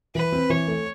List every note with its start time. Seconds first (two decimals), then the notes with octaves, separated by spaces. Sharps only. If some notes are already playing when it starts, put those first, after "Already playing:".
0.15 E3 B4
0.32 C4
0.50 E3 C#5
0.68 A3